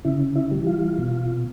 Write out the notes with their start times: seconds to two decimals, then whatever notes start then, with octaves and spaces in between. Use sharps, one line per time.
0.05 C#3 E4
0.36 E4
0.51 E3 G3
0.67 F4
0.98 B2